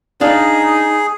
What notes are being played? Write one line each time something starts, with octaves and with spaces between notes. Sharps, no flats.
D4 D#4 G#4 F5